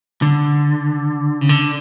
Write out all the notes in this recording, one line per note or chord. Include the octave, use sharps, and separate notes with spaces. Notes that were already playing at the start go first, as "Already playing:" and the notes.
D3
C#3
D3